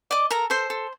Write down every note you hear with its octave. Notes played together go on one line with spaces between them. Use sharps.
D5 D#5 D6
A4 A#4 A#5
A4 C5 C6
A4